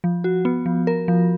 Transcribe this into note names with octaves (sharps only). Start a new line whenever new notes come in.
F3
F#4
B3
F3
A#4
F3